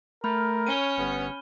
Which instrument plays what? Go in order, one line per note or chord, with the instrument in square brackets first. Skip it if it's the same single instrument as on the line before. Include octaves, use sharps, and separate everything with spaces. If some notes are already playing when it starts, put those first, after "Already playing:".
[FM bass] A3 [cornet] A#4 [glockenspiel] B5 F6 G6
[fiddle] C#4 C#5 [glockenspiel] D#7 G7
[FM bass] G1 [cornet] B3